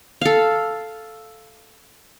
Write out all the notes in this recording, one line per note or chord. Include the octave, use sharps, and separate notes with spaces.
A4 F5